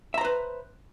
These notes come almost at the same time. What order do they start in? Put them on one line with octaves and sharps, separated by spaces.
E5 A#5 C5 B4